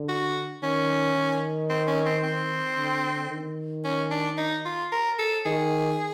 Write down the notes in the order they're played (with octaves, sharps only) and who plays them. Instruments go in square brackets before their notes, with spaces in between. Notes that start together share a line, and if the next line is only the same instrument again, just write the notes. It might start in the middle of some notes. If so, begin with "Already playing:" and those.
Already playing: [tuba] D3
[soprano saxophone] F#4
[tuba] D#3 [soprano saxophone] C#4
[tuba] D#3
[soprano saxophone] C4
C#4
C4
C4
[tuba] D3
D#3
[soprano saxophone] C#4
D4
D#4
F4
A#4
A4
[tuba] D#3 [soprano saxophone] G#4